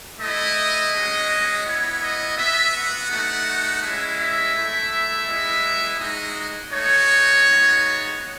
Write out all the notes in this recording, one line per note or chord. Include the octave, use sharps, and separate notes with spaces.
A3 E4 D#5
G#3 C#4 F#4
B3 E4 C#5
D#5
B3 F#4 E5
F#5
A3 D#4 F#4
G#3 C#4 E4 E5
E5
A3 E4
G#3 B3 E4
G#3 D#4 F#4 D#5
A3 D#4 F#4 C#5
G#3 B3 D#4 F#4